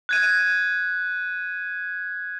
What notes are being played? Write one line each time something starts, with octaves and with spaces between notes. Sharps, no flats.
F#6 G#6 D#7